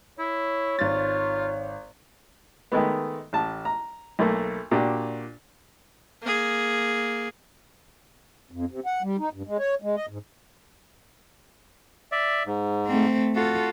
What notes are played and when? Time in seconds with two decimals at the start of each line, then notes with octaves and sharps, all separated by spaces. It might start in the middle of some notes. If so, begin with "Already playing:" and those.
0.19 E4 C#5
0.79 G#1 F4 A6
2.72 D#3 G#3 A3 B3
3.33 A1 A5
3.65 A#5
4.19 B1 A3 A#3
4.71 A#2 D4 F#4 G4
6.22 A#3 G#4
8.52 F2
8.71 C3
8.86 F#5
9.02 G3
9.18 D#4
9.33 G2
9.47 G#3
9.58 C#5
9.82 G#3
9.96 D#5
10.09 G#2
12.12 D5 E5
12.46 G#2
12.86 A3 C4
13.35 F4 F#4 A4